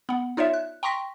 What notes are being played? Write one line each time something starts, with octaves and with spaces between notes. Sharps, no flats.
B3 F#5
D#4 F4 C#5 D5 E5
F#6
G5 A#5 C6 C#6 A#6 B6